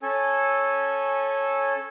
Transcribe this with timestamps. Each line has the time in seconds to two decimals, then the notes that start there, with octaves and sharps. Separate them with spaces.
0.03 C#4 A4 G#5